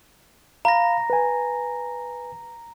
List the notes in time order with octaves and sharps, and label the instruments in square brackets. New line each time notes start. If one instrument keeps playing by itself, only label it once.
[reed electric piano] F5 B5 [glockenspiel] A#5 A#6
[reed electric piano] B4 G#5